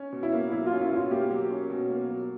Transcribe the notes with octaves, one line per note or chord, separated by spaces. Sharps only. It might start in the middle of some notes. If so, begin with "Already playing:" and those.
Already playing: C#4
B2
E4
A#3
F#3 E4
F4
C#4
E4
B2 F4
A#3 G4
F#3
C#4
B2
A#3
F#3